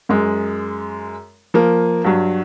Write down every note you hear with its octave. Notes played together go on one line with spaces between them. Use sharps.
F#2 G#3
F3 A#3
G2 F#3